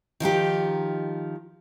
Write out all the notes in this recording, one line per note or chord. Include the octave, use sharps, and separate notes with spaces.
D#3 F3 D#4 G4